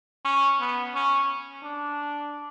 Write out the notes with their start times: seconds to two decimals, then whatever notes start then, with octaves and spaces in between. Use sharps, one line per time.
0.24 C#4
0.60 B3
0.94 C#4
1.63 D4